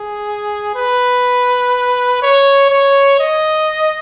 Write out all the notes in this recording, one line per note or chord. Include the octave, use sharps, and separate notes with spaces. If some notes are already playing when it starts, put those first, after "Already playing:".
Already playing: G#4
B4
C#5
C#5
D#5